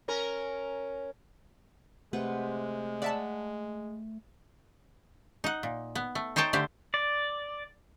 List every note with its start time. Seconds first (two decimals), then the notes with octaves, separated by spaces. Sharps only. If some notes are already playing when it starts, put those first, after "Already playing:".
0.08 C#4 A#4
2.13 C3 G#3 A3 B4 F#5
3.02 D5 E5 F#5 A5 B5
5.44 D#4 F#5
5.63 A#2
5.95 B3
6.15 A3
6.36 D#4 C5 C#5 G5 A5
6.53 D3 A3 G4 C5
6.94 D5